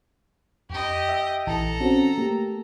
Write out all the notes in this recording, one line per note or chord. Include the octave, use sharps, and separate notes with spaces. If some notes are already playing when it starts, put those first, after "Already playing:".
F2 G4 D#5
E5
A#1 E3 A4 A5 A#5
C4 C#4 F#4
A3 A#3 G4